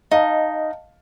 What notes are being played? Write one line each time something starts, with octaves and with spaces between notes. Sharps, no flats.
D#4 D#5 F5 A5